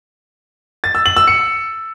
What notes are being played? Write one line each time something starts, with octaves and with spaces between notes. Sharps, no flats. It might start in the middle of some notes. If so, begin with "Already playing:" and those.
A6
E6
F#7
E6
C#7